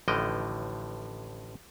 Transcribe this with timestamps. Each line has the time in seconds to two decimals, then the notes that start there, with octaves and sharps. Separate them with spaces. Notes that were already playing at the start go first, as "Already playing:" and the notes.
0.08 A1 A2 D3 F3 D#5 G5